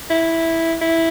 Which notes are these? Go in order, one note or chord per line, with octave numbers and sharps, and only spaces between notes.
E4
E4